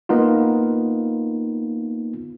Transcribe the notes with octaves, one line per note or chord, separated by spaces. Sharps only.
A#3 B3 D#4 F4